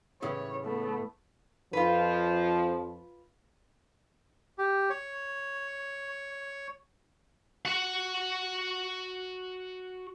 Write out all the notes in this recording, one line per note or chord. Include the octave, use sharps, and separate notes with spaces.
A2 C#3 E3 C#5
A3 B3
F2 F3 F4 B4
G4
C#5
F#4 F#5